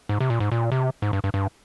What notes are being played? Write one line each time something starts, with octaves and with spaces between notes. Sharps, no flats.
G#2
C3
A#2
G#2
A#2
C3
G#2
G2
G2
G2